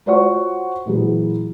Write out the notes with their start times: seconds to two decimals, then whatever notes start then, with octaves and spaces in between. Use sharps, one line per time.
0.06 F4 F#4 C5 C#5 F#5 C#6
0.85 A#2 E3 F#3 G#4